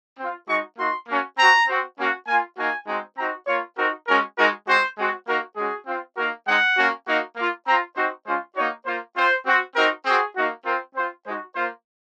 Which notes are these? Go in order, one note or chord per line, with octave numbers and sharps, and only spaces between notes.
C4 F4
G#3 D#4 F#4 C#6
A#3 D#4 F#4 C6
A#3 C#4 F#4
C4 F#4 A#5
C4 F#4
A#3 C#4 F#4
A#3 F4 G#5
A#3 D#4 F#4 G#5
G#3 C4 D#4 F#4
C4 D#4 F#4 A#5
A#3 F4 C#5
C4 D#4 F#4 A#4
G#3 C#4 F#4 A#4
G#3 D#4 F#4 A#4
G#3 C4 F#4 C5
G#3 C4 F#4
A#3 D#4 F#4 A#4
G#3 C#4 F#4 G#4
C4 F4
A#3 D#4 F#4 A#4
G#3 C4 D#4 F#5
A#3 C#4 F#4
A#3 D#4 F#4
A#3 F4
C4 F4 A#5
C4 D#4 F#4 C5
G#3 C#4 F4 C5
A#3 D#4 F#4 C#5
A#3 F4 C5
C4 F4 C5
C4 F#4
C4 D#4 F#4 A#4
C4 F#4 G#4
A#3 D#4 F#4
C4 F4 A#4
C4 F4 C5
G#3 D#4 F#4 C5
A#3 F4 C5